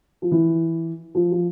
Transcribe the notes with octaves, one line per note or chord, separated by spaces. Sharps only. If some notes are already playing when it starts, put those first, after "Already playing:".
F3
E3
F3
F3